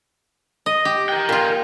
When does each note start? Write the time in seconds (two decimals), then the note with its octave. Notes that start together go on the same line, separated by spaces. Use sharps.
0.66 D#5
0.85 G4
1.09 A#4 G5
1.29 A#2 F4